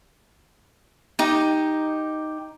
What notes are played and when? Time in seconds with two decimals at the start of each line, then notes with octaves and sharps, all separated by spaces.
1.19 D#4 G4